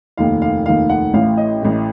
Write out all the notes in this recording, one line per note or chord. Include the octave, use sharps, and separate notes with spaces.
F1 D#2 D#3 F5
F5
F1 D#2 D#3 F5
F#5
A1 A2 F5
D#5
A1 A2